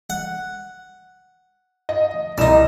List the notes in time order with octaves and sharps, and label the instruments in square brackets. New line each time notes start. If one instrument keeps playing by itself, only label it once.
[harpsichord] F#5
[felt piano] D#5
[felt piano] C2 E7 [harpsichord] D#4 D5